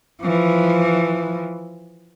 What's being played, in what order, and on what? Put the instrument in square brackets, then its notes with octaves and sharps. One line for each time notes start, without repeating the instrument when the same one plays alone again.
[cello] E3 F3